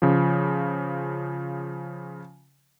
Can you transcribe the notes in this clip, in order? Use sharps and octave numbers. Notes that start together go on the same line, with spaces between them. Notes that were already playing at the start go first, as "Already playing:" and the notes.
C#3 F3